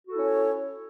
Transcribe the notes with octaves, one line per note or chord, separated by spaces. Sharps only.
C#4 E4 F#4 A4 C#5